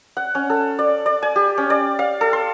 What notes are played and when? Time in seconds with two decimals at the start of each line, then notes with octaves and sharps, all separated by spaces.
0.17 F#5
0.35 C#4
0.50 A4
0.79 D5
1.06 D5
1.23 G#5
1.36 G4
1.58 C#4
1.70 D5
1.99 F5
2.21 A4
2.33 C6